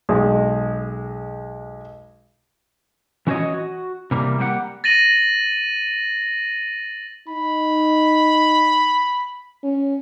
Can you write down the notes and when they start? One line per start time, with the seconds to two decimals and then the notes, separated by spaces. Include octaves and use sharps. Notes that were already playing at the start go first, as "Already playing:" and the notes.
0.09 B1 G#3
3.27 E3 C#4 F#4 C5 C#5 D#5
3.54 F#4
4.11 C3 E3 G3 A#3
4.39 G3 A#3 G4 B4 F#5
4.84 A6 A#6 D#7 F#7
7.28 D#4 B5
9.64 C#4